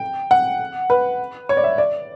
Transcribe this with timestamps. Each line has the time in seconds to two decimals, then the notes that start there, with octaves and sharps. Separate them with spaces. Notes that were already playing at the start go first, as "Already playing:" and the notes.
Already playing: G5
0.31 F#5
0.90 B4
1.49 C#5
1.57 D5
1.64 E5
1.78 D5